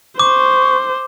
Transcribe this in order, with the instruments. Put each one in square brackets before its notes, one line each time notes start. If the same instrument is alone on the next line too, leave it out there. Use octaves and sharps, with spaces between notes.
[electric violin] C5 [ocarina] C#6 [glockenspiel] D6